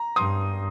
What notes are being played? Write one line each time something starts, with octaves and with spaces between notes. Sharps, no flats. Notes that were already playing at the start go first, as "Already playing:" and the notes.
Already playing: A#5
G2 C6 D#6